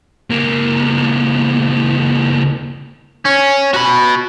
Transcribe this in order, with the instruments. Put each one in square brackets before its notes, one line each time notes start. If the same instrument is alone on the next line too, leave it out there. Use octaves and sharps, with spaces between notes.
[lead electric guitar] C#2 A#3
[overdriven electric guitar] C#4
F#4 B5